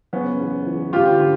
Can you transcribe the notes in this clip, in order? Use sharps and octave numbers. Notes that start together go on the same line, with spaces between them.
F#1 B3 C#4
E2
E3
D2 F4 G4
D3